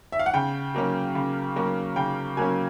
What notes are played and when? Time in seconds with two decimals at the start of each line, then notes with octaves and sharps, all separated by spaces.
0.12 E5
0.19 F5
0.26 F#5
0.34 C#3 G5
0.75 F#3 A#3 C#4
1.15 C#3
1.56 F#3 A#3 C#4
1.96 C#3 G5
2.37 F#3 A#3 C#4 G#5